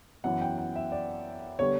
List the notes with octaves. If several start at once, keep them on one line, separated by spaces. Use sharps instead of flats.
F#2 E3 B3 F#5
G5
F#5
E5
D5
D3 G3 B3 C#5